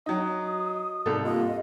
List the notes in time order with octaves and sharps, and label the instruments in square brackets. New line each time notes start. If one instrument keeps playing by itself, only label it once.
[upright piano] F#3 D#4 [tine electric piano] D#5 [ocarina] D#6
[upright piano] C2 A4 [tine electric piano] G#2
[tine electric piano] A#3 F4 G4 [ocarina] D#5